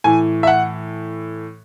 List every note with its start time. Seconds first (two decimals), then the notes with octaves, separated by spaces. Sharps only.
0.04 A2 E3 G#5
0.43 E5
0.47 F#5